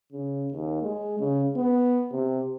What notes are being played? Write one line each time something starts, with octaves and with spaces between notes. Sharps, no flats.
C#3
D#2
G#3
C#3
B3
C3